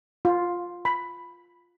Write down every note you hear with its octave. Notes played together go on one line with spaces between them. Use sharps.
F4
B5